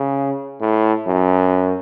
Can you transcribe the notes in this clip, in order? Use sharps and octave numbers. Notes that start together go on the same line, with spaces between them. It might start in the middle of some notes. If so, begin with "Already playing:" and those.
Already playing: C#3
A2
F#2